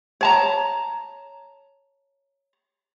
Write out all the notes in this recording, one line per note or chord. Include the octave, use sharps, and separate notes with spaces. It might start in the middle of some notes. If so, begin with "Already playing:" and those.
C#5 A5 A#5